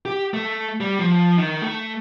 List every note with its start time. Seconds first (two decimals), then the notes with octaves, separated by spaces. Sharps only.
0.05 G4
0.34 A3
0.81 G3
0.99 F3
1.38 D#3
1.62 A3